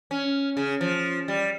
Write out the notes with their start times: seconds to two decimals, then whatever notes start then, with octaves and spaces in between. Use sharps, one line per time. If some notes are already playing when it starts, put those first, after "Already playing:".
0.11 C#4
0.57 C#3
0.81 F3
1.28 G3